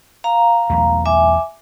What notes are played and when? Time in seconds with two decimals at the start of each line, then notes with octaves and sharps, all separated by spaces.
0.24 F5 A#5
0.70 B1 E2 A3
1.06 E5 G#5 D6